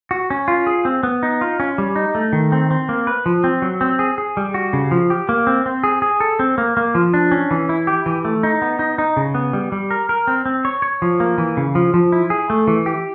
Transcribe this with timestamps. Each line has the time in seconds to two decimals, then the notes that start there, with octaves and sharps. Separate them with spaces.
0.11 F#4
0.30 C#4
0.48 F4
0.67 G#4
0.85 C4
1.03 B3
1.23 D#4
1.41 F4
1.60 C#4
1.78 G3
1.96 D#4
2.15 A3
2.33 D#3
2.52 C4
2.71 C4
2.89 A#3
3.07 B4
3.26 F3
3.44 C4
3.62 F#3
3.81 C4
3.99 G#4
4.18 G#4
4.37 G3
4.54 F#4
4.73 C#3
4.91 F3
5.10 G4
5.29 A#3
5.47 C4
5.66 C4
5.84 G#4
6.02 G#4
6.20 A4
6.39 C4
6.58 A#3
6.77 A#3
6.95 F3
7.14 D4
7.32 C#4
7.51 E3
7.69 E4
7.87 G4
8.06 E3
8.25 A3
8.43 D#4
8.62 B3
8.79 D#4
8.98 D#4
9.17 C#3
9.35 B3
9.53 G3
9.72 G3
9.91 A#4
10.09 A#4
10.27 C4
10.46 C4
10.65 C#5
10.82 C#5
11.02 F3
11.20 A#3
11.38 E3
11.57 C#3
11.75 F3
11.94 F3
12.12 E4
12.30 G#4
12.50 A3
12.67 E3
12.86 G4